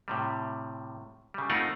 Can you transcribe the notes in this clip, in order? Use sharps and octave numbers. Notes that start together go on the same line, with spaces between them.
A2 C3 G3
C#3 G3
A3 C4 D#4 F4 A#4 F#5